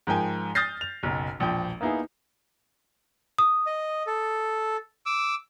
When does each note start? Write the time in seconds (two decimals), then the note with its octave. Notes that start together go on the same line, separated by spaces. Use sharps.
0.07 G#2 F3 A#4 G5 G#5
0.55 D#6 F6 G6 A6 A#6 C7
0.81 F7
1.03 F#1 B1
1.39 E1 A#1 F3 G5
1.81 A#3 B3 D#4 E4 G#4
3.38 D#6
3.67 D#5
4.07 A4
5.06 D6 E6